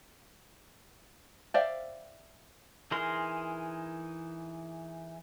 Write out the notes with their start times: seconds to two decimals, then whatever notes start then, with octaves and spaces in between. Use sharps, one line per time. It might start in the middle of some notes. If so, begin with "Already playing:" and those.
1.54 C5 D5 E5 F5 G5
2.91 E3 D#4 G#4 A#4 C6